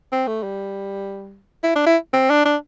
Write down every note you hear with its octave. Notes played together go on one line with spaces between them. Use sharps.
C4
A3
G3
E4
D4
E4
C4
D4
D4